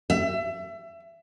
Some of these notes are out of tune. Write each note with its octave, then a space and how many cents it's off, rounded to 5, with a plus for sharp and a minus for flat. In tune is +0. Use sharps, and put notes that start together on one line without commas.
E5 +25